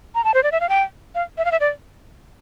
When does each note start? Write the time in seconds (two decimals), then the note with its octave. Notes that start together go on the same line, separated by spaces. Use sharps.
0.15 A#5
0.24 A5
0.34 C5
0.43 D5
0.52 E5
0.60 F5
0.69 G5
1.15 F5
1.38 E5
1.45 F5
1.52 E5
1.60 D5